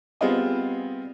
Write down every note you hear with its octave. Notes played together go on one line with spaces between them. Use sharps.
G3 B3 C4 F4 G#4 D#5